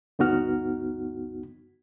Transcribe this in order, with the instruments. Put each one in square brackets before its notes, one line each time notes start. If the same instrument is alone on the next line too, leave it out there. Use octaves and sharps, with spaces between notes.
[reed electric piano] D2 G2 B3 D#4 F#4 F6